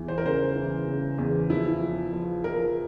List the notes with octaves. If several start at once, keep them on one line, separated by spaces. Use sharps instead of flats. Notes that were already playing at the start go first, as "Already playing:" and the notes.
Already playing: E2 E3
C5
A#4
C#3 C5
E3
C#3
E2
F3 E4
F3
F3
F3 A#4